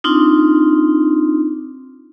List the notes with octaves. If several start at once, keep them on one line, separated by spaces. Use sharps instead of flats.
C4 D4 D#4 F4